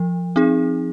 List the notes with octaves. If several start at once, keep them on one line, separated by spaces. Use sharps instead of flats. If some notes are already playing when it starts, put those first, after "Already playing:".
Already playing: F3
C4 D#4 G#4